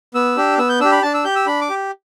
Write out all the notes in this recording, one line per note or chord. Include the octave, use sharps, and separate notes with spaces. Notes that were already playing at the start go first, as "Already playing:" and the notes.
B3 E6
D4 G4
B3 E6
G6
D4 G4 E6
B5
D4 A5
E6
G4 G6
E6
D4 B5
D6
G4